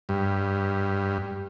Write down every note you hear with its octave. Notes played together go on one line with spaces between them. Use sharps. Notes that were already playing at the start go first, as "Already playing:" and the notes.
G2